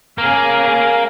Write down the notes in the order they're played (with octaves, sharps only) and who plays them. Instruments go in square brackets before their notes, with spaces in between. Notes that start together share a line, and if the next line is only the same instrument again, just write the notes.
[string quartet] C#3 G#4 F6 [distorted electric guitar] A#3